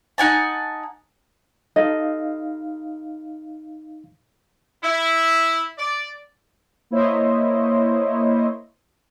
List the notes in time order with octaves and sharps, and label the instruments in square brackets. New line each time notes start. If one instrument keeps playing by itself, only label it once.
[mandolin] D#4 F#5 G#5 A5
[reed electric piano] D#4 F5 [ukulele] A4 D#5
[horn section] E4
D5
[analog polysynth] A#3 E4 C5 C#5 D#5